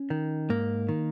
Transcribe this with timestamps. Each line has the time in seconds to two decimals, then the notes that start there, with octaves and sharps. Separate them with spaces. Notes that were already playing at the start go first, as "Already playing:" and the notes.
Already playing: C#4
0.10 D#3
0.50 G#2 A#3
0.89 D#3